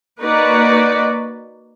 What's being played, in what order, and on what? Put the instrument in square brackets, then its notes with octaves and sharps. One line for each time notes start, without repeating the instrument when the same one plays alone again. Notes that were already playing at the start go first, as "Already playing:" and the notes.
[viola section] A#3 D#4 F#4 B4 D5